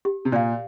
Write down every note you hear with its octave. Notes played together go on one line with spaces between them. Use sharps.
G4
C3
A#2 D5 F5